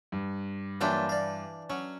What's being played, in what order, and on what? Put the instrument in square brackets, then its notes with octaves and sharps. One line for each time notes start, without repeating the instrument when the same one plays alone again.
[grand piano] G2
[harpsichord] A#2 F#3 F4 [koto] E3 D4 G5
[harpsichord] D5 F5
[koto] F#3 [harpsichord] C#4